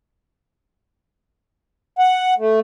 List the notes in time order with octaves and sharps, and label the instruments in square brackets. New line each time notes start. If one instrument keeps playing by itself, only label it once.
[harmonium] F#5
A3